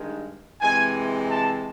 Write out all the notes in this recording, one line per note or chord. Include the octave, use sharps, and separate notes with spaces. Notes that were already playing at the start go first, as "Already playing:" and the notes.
Already playing: G2 D#3 G#3
C3 E3 G#3 G#5
A5